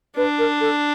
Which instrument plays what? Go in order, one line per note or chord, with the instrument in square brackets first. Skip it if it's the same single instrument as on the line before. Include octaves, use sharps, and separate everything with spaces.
[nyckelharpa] D4 [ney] B4
[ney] A#4
A4